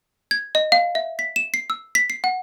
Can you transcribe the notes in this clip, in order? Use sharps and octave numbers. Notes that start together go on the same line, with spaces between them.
G#6
D#5
F5
E5
B6
E7
C7
E6
B6
C7
F#5